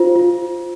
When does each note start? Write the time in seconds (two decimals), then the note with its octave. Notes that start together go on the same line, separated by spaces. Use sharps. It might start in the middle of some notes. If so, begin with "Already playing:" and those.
Already playing: F4 C5
0.15 F4